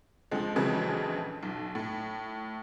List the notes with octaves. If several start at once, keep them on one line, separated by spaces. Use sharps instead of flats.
C#2 D3 F3 G#3
A#1 F2 C#3 E3 F#3 G#3
B1
A2